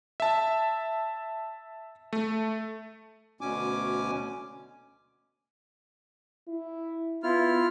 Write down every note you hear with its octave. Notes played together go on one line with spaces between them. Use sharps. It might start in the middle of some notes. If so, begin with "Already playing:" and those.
E5 A5
A3
D2 B2 C#4 G#5 D6
E4
B3 E4 F4 F6